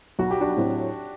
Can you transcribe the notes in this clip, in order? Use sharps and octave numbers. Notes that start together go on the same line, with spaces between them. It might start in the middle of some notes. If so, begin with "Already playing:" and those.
B1 F#4
G4
D4 F#4
A2 F#3 C4